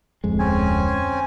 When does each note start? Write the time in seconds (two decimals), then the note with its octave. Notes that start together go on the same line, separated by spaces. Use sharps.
0.24 D1 F2 G#3
0.39 C4 C#4 G#5